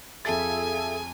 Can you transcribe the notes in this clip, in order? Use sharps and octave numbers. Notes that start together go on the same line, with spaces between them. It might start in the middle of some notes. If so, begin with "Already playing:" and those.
F2 F4 G#4 A4 E5 G#5 A5 A6